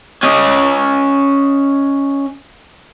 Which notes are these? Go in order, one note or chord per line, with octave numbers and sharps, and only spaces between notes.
C#4 D#5